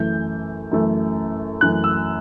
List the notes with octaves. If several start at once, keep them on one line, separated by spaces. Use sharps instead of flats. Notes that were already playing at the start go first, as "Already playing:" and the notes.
Already playing: F#2 E3 A3 G6
F#2 E3 A3
F#2 E3 A3 F#6
E6